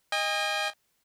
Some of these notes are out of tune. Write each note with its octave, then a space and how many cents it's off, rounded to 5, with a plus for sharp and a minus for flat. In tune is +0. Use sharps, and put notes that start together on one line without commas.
D#5 +0 G#5 -45